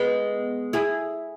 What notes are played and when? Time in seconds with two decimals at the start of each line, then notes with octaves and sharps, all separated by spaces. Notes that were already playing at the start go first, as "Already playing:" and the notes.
Already playing: G#3 B3
0.73 E4 G#4